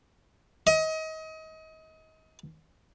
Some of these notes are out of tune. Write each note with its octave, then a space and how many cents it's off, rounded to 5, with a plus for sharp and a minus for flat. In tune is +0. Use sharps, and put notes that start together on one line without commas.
D#5 +30